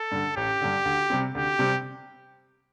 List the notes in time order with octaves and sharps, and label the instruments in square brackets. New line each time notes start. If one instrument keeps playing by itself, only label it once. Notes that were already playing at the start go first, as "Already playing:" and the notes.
Already playing: [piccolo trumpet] A4
[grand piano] G2 D3
[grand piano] A1 [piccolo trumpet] G4
[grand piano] G2 D3
D2
C3 G3 C4
[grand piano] D2 [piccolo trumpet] G4
[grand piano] C3 G3 C4